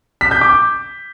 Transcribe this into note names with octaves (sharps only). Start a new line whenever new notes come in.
B6
G6
D6